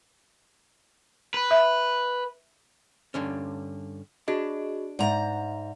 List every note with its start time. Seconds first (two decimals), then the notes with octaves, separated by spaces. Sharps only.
1.34 B4
1.51 E5
3.14 G2 D3 C#4
4.28 D4 F#4 G#4 D#5
4.99 G#2 D5 E5 A#5